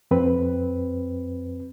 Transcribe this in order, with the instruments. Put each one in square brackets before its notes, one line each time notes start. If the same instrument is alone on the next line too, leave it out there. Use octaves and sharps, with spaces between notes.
[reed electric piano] F2 C4 B4